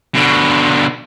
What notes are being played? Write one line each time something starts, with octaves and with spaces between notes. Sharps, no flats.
B2 D3